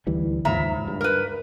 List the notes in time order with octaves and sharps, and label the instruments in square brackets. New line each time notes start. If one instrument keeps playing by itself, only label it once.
[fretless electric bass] D2 E3 G3
[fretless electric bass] D#2 G#2 F3 [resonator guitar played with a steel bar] C#3 E5 A#5
[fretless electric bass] G2
[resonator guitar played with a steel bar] A#4 B4